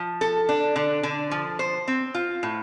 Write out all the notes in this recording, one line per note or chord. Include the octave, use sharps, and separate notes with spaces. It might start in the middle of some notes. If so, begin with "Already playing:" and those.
Already playing: F3
A4
D4
D3
D3
F3
C5
C4
F4
A2